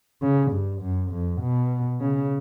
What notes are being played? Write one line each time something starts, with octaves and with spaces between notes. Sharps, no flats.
C#3
G2
F#2
F2
B2
C#3